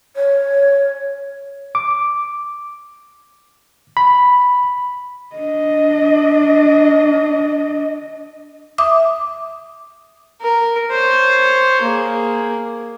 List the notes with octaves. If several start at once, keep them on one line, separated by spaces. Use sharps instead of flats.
C#5
D6
B5
D4 D#5
E5 D6 D#6
A#4
C5 C#5
A#3 G#4